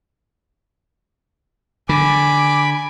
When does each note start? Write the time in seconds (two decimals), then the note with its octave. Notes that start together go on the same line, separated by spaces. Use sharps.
1.89 D3 G#5 B5 D6